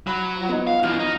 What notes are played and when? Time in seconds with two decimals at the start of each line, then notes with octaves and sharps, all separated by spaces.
0.07 F#3 B5
0.34 F3 F#4
0.49 B3 D#4 F4 F#5
0.67 F5
0.83 F#2 E3 F#4 F6
0.99 D#4